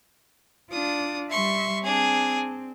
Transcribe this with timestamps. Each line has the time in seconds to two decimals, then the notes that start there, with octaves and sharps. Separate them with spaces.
0.71 D4 F4 D#6
1.30 G3 E5 C6 C#6
1.84 C4 D4 G#4